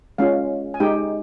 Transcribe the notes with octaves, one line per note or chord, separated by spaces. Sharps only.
G#3 C#4 F4 F5
G#5
G#3 D#4 G4 G5